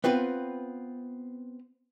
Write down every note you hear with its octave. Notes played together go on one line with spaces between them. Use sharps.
B3 C4 F4 B4